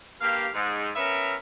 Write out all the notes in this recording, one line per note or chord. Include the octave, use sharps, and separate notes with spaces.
G2 A#3 G4 F5
G#2
B3 C#4 A#4 E5